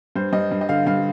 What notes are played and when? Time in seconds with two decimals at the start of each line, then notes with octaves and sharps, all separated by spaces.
0.16 G2 C5
0.33 G2 D#5
0.51 G2
0.61 D#5
0.69 D3 F5
0.87 G2 F5